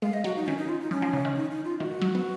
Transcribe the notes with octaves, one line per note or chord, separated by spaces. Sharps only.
G#3 F5
D#5
F#3 F#4
D#4
D#3 C#4
D#4
F4
D#4
F3 C#4
F3
C#3
D#3
D#4
D#4
F4
D#3 F#4
F#3
B3